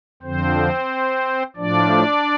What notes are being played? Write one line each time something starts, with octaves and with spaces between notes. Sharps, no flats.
F2 D3 F3 C4 C5
A2 F3 D4 D5